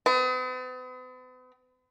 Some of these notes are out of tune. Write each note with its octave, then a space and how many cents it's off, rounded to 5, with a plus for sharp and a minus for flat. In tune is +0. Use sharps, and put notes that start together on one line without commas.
B3 +45